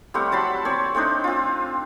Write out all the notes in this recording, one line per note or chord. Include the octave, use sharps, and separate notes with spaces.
G3 A3 C4 F#5
F#3 A5 B5 C6
C4 C#5 D5
A3 C4 D4 D#4
C4 F4